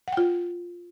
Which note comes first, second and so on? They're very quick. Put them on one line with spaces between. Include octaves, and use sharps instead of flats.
F#5 G5 F4